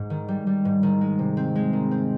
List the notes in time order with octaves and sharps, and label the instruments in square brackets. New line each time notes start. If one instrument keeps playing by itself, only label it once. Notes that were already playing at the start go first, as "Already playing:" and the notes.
Already playing: [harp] G#2
D#3
G3
G3
G#2
D#3
G#3
C3
C4
G#3
D#3
C4